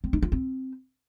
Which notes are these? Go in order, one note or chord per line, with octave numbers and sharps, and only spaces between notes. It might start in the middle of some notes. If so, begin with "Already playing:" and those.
C4
D#4
F4
C4